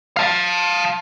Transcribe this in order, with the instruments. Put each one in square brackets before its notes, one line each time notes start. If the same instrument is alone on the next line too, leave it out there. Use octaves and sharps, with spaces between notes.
[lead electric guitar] F5 A5